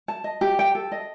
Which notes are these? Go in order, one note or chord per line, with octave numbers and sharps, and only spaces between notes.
A5
D#5
G4
G5
A4
D#5